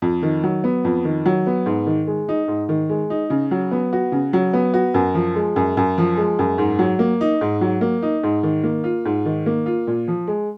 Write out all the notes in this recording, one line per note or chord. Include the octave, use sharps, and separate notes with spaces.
F2
D#3
F#3
B3
F2
D#3
F#3
B3
G#2
D#3
G#3
D#4
G#2
D#3
G#3
D#4
C#3
F#3
B3
F#4
C#3
F#3
B3
F#4
F#2
F3
G#3
F#2
F#2
F3
G#3
F#2
G#2
F#3
A#3
D#4
G#2
F#3
A#3
D#4
G#2
D#3
A#3
F4
G#2
D#3
A#3
F4
A#2
F3
G#3